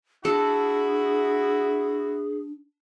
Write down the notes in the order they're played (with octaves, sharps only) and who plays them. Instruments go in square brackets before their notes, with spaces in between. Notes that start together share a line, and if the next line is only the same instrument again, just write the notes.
[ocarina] D4 [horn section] E4 F#4 [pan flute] G#4 [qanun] A4